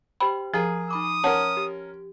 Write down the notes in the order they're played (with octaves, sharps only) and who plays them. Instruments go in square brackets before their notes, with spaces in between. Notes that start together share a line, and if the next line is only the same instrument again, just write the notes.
[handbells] G4 C5 G5 [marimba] B5
[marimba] F3 [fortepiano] G#4 [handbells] A#4 A#5 F6
[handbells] D#4 B5 D6 [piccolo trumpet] D#6
[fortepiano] C#4 A#4 [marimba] F#5 A5
[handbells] G4